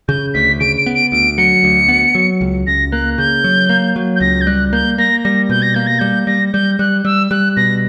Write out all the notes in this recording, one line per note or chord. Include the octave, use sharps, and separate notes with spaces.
C#3 G6
D2 B6
C#3 D7
D7
B3
D7
D2 D7
F#3 C#7
D2
B3
F#3
C#2
C#2 A#6
A#3 F#6
C#3 G6
F#3
A#3
F#3
G6
C#2 A#6
G6
G3 F#6
A#3 G6
A#3 A#6
G3 A#6
B2 G6
A#6
A#3 G6
A#6
G3 G6
G3 A#6
G3 G6
G3 F#6
G3 E6
G3 F#6
B2 A#6